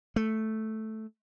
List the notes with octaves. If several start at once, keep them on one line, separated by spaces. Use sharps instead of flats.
A3